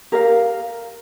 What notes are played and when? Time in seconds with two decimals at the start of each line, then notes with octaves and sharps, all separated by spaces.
0.12 G4 A#4 F5